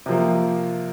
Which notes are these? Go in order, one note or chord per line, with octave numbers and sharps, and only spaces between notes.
C3 F3 A#3